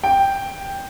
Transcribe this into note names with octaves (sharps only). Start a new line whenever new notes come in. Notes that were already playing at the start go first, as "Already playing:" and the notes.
G5